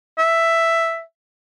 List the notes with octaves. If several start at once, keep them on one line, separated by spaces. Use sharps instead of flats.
E5